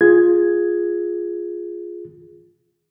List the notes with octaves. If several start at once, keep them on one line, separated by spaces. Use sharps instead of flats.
F4 G#4 G#6